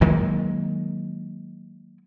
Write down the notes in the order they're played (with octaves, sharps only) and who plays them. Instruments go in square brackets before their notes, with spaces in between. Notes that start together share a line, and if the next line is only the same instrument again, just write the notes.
[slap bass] D#3 F#3 G#3 A#3